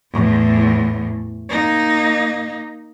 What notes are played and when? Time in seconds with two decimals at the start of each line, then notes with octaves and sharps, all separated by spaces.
0.12 E2 A2
1.49 A#3 D#4